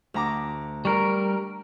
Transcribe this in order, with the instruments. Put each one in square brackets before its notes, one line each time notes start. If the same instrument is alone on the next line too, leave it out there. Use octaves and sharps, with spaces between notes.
[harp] D2 A#5 D6
[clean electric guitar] G3 A#4 [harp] C#6